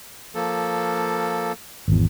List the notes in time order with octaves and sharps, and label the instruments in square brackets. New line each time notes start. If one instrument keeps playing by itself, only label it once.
[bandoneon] F3 A#3 A4
[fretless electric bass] G#1 E2